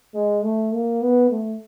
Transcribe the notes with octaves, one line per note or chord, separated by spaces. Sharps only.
G#3
A3
A#3
B3
A3